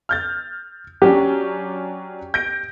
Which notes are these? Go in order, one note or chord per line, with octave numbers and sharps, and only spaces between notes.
F6 G6 A6
F#3 C#4 D4 G4
G6 A#6 D7